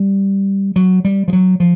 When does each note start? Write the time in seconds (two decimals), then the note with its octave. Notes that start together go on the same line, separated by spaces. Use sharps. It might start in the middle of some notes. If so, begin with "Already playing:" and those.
Already playing: G3
0.76 F#3
1.05 G3
1.28 F3
1.33 F#3
1.60 F3